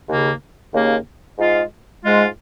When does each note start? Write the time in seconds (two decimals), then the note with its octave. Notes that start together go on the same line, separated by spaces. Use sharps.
0.09 D#2 C#3 A#3
0.73 D#2 C#3 A#3
1.38 G#2 G#3 F4
2.04 G#2 G#3 F4